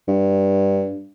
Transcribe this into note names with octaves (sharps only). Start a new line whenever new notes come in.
G2